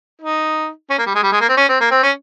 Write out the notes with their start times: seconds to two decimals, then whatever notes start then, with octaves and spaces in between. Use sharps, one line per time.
0.21 D#4
0.90 C#4
0.98 A#3
1.06 G3
1.15 G#3
1.23 G3
1.32 G#3
1.40 A#3
1.49 C4
1.57 C#4
1.69 C4
1.80 A#3
1.91 C4
2.03 C#4